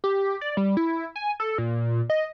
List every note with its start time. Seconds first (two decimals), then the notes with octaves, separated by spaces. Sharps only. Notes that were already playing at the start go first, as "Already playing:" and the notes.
0.04 G4
0.41 D5
0.57 G3
0.77 E4
1.16 G#5
1.40 A4
1.58 A#2
2.10 D#5